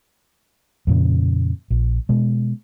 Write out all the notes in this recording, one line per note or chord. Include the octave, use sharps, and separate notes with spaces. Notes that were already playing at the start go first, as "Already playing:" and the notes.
F2 A#2 C#3
A#1
B2 G#3